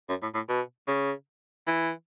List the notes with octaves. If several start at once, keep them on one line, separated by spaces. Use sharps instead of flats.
F#2
A2
A2
B2
C#3
E3